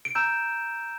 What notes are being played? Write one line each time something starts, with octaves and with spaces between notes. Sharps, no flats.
D7
A#5 E6 G6 E7